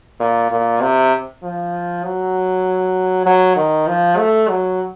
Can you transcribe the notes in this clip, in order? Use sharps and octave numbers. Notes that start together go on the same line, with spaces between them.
A#2
A#2
C3
F3
F#3
F#3
D#3
F3
A3
F#3